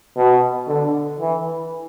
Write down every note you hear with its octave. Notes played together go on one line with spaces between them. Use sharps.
B2
D3
E3